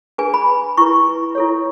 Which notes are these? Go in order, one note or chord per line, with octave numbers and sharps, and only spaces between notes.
D4 G#4 B4 G#5
B5
E4 B4 C#6
E4 A4 C#5